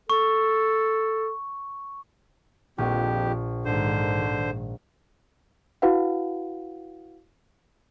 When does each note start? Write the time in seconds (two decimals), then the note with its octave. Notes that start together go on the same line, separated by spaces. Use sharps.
0.10 A4 C#6
2.78 A#1 F2 G4
3.65 G#2 D3 D#3 C5
5.82 E4 F#4 B4 F5 F#5